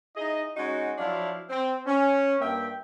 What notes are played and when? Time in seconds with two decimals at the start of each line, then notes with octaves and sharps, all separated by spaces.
0.16 D#4 E4 G#4 D#5
0.56 G#3 C#4 D#4 F#4
0.98 F3 F#3 D4 E4 F#4 F5
1.50 C4
1.86 C#4
2.40 G2 A#3 E5 G5